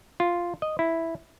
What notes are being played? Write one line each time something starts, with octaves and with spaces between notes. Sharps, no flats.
F4
D#5
E4